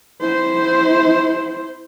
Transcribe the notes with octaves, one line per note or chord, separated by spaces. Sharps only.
E4 C5